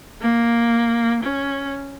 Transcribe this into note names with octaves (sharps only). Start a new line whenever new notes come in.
A#3
C#4